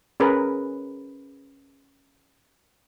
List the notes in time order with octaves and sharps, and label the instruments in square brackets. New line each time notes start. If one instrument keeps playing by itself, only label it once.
[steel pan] C#4 G#4 A#4 B4